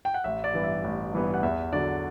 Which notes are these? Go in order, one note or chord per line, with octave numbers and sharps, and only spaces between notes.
G5
F#5
A1 E5
D5
G2 E3 B3
E5
A1
G2 E3 B3
F#5
E2 E5
D3 F#3 D5